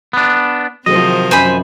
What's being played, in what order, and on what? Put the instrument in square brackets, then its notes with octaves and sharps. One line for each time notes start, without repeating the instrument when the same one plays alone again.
[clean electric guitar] B3 D4
[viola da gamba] C3 D#3 F3 [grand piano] F#3 G#4 C5 [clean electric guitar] D#5
[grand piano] F#2 [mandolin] C5 G#5 B5